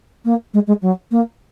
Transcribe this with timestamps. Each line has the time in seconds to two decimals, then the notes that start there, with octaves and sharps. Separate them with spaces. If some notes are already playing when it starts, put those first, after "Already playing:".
0.25 A#3
0.54 G#3
0.67 G#3
0.82 F#3
1.11 A#3